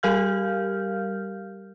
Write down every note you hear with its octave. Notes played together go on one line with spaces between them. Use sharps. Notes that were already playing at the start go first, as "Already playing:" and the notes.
G3 G4 A#4 F5 F6 G6